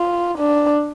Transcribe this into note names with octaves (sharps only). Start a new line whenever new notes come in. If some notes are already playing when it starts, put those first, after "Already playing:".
Already playing: F4
D4